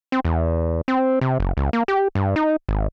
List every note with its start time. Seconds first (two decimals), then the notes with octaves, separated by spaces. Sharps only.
0.12 C4
0.25 E2
0.88 C4
1.21 C3
1.40 F#1
1.57 C#2
1.73 A#3
1.88 G4
2.15 G2
2.36 D#4
2.69 G#1